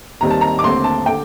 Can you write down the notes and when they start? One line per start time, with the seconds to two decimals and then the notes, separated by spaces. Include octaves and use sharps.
0.21 D#2 D#3 G3 C4 A#5
0.31 A5
0.41 A#5
0.59 D6
0.63 D#2 D3 A3 C4 C6
0.84 A5
1.06 D3 A3 G5